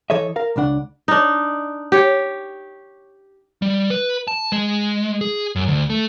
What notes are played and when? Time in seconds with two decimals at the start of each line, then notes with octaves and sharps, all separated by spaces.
0.10 E3 A4 C#5 D#5 E5
0.36 A#4 F5
0.56 C#2 C#3 D4 F#5
1.08 D4 D#4
1.92 G4 C#5
3.62 G3
3.90 B4
4.28 A5
4.52 G#3
5.21 G#4
5.56 F#2
5.68 D2
5.90 A3